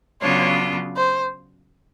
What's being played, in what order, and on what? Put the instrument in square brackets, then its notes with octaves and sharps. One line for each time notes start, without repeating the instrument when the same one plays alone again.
[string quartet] C#3 F#3 B3 D4 F4 [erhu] C#5
[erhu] C5